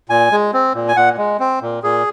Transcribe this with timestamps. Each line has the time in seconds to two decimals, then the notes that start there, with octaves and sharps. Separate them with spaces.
0.09 A#2 G#5
0.32 G#3
0.53 C4
0.75 A#2
0.88 G#5
0.96 A#2 F#5
1.18 G#3
1.40 C4
1.62 A#2
1.83 A#2 G#4